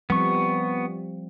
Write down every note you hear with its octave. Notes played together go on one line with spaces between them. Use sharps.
F3 G3 B3 C4 C#6